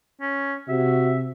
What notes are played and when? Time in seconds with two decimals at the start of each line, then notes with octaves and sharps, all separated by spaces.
0.21 C#4
0.69 C3 F#4 E5